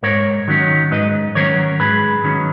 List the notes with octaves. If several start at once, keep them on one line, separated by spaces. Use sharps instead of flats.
G#2 A#4 C#5
D#3 F#3 C#4
G#2 B4 D#5
D#3 F#3 C#4 A#4 C#5
G#2 G#4 B4
D#3 F#3 C#4